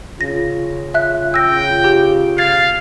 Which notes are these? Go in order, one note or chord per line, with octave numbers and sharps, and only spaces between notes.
C#3 F4 A#6
E5 F#6
G5 E6 A#6
G4
F5 G#6 A6 C7